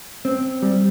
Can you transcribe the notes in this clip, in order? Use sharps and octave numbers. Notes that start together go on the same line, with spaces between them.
C4
G3